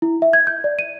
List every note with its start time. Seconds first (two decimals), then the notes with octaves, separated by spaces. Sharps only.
0.02 E4
0.22 E5
0.33 G#6
0.47 G6
0.64 D5
0.79 D#7